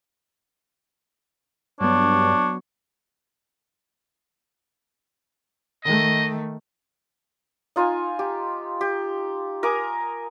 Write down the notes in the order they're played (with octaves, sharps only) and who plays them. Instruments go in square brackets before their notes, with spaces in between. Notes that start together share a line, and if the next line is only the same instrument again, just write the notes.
[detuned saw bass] G2 [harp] F#3 B3 [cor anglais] D4 [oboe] C#5
[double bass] D#3 A3 [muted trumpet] D#5
[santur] D#4 F4 D#5 G#5
G4
G4
A#4 G#5 D6 D#6